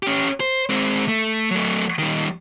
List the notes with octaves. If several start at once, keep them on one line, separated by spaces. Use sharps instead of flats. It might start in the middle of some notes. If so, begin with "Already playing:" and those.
C#4 G4
C5
G#3 C4
A3
F#3 A3
D#3 G3